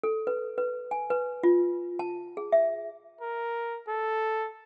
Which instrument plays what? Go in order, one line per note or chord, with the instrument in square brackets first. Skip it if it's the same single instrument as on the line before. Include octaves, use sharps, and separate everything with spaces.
[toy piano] A4
B4
B4
G#5
B4
F4
A5
G#4
E5
[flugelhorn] A#4
A4